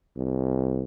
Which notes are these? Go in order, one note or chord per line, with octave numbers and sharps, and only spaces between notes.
C2